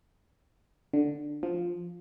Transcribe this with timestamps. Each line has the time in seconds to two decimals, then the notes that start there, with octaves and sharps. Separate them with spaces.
0.93 D3
1.43 F3